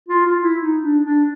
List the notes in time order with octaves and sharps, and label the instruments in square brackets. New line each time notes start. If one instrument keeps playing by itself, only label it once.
[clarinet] F4
F4
E4
D#4
D4
D4